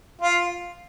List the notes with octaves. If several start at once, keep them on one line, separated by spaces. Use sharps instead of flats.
F4